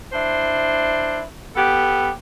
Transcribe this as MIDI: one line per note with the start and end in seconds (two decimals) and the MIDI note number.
0.12 1.20 62
0.12 1.20 64
0.12 1.20 72
1.55 2.09 59
1.55 2.09 67
1.55 2.09 69